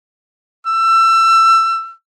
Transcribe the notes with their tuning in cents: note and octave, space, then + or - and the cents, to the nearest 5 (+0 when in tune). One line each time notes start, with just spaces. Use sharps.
E6 +25